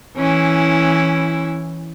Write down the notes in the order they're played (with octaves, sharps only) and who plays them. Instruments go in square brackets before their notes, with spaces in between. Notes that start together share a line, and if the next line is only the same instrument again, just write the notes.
[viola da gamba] E3 C#4 E4